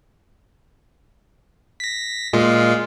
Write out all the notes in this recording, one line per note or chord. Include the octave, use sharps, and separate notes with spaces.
A#6 B6
A#2 G#3 F4